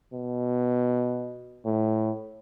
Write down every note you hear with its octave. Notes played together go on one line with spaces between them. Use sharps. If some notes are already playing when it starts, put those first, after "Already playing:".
B2
A2